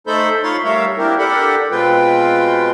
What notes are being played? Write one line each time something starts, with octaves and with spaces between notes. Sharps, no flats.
A3 D#4 A4 C5 B5 G6
D#4 F4 C#5 F5 B5 C6
G3 A3 A#4 C#5 E5 F5
A#3 C4 D4 E4 G4 A#4
D4 G4 A4 A#4 F#5 B5
B2 G#3 C4 F4 B4 G5